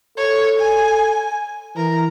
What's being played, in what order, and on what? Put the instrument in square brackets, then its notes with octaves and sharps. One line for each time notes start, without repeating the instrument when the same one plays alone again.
[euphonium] A4 [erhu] C#5
[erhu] G#5
[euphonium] E3 [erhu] A#4